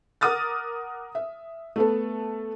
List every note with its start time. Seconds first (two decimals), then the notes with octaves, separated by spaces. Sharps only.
0.21 A#4 F#5 D6 D#6 F6 A6
1.15 E5
1.76 A3 B3 A4